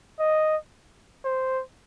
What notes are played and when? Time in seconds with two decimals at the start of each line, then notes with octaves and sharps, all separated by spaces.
0.19 D#5
1.25 C5